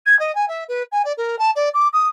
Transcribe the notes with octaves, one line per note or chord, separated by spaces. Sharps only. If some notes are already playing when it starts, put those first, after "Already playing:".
G#6
D#5
G#5
E5
B4
G#5
D5
A#4
A5
D5
D6
D#6